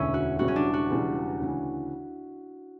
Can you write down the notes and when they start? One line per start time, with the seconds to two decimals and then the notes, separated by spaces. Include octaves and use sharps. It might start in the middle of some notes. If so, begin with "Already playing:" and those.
Already playing: E1 D2 D3 C#4 E4
0.14 F#4
0.39 E1 E2 C#3 E3 G3 F#4
0.48 C#4
0.56 D4
0.74 F#4
0.90 E1 E2 C#3 E3 G3
1.40 D2 C#3 E3